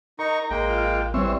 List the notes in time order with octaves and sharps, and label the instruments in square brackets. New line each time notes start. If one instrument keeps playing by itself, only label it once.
[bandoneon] D#4 C#6 [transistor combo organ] A#4
[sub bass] A1 [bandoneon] G#3 A#3 G5
[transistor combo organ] F4
[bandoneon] E3 [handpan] G3 B3 C4 [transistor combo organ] C5 C#5 E5